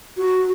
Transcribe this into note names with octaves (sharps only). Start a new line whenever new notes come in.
F#4